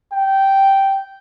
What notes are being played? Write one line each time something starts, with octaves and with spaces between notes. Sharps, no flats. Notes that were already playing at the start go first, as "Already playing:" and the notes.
G5